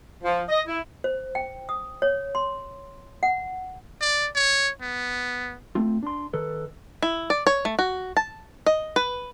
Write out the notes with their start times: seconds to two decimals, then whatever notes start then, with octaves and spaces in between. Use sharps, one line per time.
0.24 F3
0.49 D#5
0.68 E4
1.04 C5
1.35 G5
1.69 D#6
2.02 C#5
2.35 C6
3.23 F#5
4.01 D5
4.35 C#5
4.81 B3
5.75 A3 C4 F4
6.03 D4 C6
6.33 D#3 A4 B4
7.02 E4
7.30 D5
7.47 C#5
7.65 A3
7.79 F#4
8.17 A5
8.66 D#5
8.96 B4